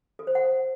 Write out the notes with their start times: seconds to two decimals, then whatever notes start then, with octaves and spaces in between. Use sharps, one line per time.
0.19 A4
0.27 C5
0.35 F#5